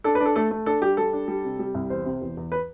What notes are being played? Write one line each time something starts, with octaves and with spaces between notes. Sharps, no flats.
D4 A4
B4
D4
A4
A3 A4
A3
D4 A4
G3 G4
G3 A4
D4
G3
C3
G3
C2
E2 C5
C3
E2
E2
B4